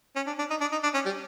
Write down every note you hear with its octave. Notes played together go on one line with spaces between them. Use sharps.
C#4
D4
D4
D#4
D4
D#4
D4
C#4
G3